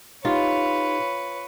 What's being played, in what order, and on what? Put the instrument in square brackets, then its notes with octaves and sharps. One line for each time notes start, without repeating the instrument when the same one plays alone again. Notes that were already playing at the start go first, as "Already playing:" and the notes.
[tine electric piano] D#4 G4 [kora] F4 [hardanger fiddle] B4 C#5